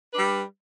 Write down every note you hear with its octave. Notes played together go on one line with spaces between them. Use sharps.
G3 D4 B4